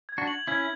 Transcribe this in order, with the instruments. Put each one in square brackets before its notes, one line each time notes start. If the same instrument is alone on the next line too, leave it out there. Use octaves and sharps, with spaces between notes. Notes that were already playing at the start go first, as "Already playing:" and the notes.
[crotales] G#6
[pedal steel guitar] D4 F#4
[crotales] F#7
[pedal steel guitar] C#4 E4 [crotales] G#6